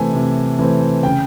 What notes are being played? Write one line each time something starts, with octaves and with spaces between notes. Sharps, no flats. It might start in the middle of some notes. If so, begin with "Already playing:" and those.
Already playing: C3 E3 A3 C4 G#5
C3
E3 A3 C4
C#3 G5